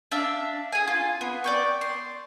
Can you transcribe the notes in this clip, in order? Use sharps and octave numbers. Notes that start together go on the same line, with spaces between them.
D4 E5 F5
G#4 G#5
F4
B3
D5 G5 C#6
C6